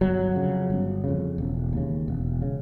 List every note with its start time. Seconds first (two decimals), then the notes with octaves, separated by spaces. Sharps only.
0.01 G1 F#3
0.35 F2 C#3
0.70 G1
1.04 F2 C#3
1.38 E1
1.73 D#2 C#3
2.08 E1
2.42 C#3